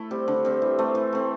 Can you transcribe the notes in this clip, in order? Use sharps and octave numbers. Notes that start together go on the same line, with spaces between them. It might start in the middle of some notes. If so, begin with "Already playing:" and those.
Already playing: A3 E4
G3 C4
D3
G3 C4
E3
A3 C4
E3
A3 C4